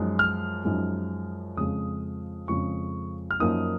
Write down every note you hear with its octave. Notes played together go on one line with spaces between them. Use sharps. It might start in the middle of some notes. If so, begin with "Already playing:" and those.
Already playing: F#2 F3 G#3 D#4
F6
F#2 F3 G#3 D#4
F2 C#3 F3 G#3 D#6
F2 C#3 F3 G#3 C#6
F6
F#2 F3 A#3 D#4 D#6